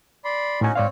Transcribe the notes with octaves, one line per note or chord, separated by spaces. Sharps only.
D5 B5 C6
A2 C#4 D#4 F#4 G#5
G#2 C4 C#5 D5 F5